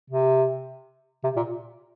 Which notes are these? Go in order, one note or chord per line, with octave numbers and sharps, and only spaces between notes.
C3
C3
A#2